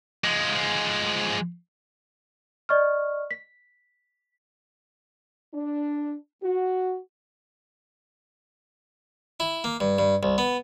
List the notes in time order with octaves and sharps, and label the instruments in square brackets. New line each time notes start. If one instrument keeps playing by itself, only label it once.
[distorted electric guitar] F3 G#3
[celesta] D5 D#5 C#6 F6
B6
[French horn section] D4
F#4
[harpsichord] E4
A#3
G2
G2
C2
B3